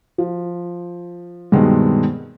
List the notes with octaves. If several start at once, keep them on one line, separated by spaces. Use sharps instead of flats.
F3
G2 B2 D#3 G#3 B3 C4